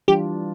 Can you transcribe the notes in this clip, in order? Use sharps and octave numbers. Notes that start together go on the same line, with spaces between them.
E3 G3 D4 F4 G4